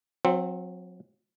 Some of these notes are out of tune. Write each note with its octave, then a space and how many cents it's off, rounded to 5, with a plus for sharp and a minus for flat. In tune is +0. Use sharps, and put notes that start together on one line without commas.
F#3 -35 C4 +0